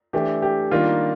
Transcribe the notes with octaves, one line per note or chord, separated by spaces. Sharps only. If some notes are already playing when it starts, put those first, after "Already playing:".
E3 A3 D4 G4
G4
D#3 G3 A#3 D4 F4